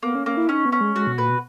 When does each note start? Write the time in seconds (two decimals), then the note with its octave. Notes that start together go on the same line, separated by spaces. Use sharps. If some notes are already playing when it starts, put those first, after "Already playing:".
0.03 A#3 B3
0.15 C#4
0.26 A#3 C#4
0.37 E4
0.49 C#4 D#4
0.65 B3
0.72 C#4
0.81 G#3
0.96 G#3 F#4
1.07 B2
1.18 A#2 B4
1.30 B2